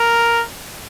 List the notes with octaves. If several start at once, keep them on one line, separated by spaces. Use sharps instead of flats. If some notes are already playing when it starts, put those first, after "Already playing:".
Already playing: A#4